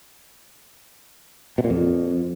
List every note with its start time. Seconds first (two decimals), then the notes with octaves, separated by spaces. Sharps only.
1.58 B2
1.64 A#2
1.70 F2